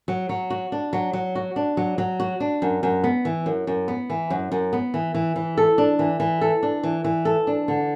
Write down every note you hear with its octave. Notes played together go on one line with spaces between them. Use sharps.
F#3
F#3
F#4
D4
F#3
F#3
F#4
D4
F#3
F#3
F#4
D4
F#2
F#2
B3
E3
F#2
F#2
B3
E3
F#2
F#2
B3
E3
E3
E3
A4
D4
E3
E3
A4
D4
E3
E3
A4
D4
D3